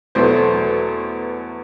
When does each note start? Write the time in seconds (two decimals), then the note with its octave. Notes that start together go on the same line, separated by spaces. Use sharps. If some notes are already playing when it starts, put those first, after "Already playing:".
0.15 E2 B2 F#3 A3 C5